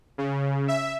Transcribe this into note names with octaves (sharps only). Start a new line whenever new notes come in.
C#3
E5